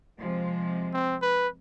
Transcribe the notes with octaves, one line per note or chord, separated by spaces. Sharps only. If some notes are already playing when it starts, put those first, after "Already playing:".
C3 F3 G#3
C4
B4